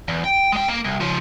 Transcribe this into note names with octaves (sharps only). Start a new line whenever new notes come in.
E2
G5
G#3 G5
A#3
C2
C#3 F3